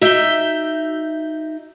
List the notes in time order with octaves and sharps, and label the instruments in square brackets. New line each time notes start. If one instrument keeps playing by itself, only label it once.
[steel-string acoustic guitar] D#4 E5 [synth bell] F#4 G6 G7